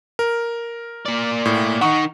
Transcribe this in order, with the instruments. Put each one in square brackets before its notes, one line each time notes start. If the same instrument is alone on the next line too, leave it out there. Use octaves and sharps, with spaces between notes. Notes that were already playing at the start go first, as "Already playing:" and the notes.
[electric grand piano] A#4
[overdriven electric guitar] A#3 D5
[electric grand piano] A2
[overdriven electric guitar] D#3 D#4 [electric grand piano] F#5 C#6